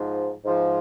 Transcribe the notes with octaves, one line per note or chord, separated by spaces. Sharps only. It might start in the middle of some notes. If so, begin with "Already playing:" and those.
Already playing: G#2 F3
G#2 F3